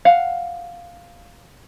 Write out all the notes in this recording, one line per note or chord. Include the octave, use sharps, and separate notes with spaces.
F5 F#5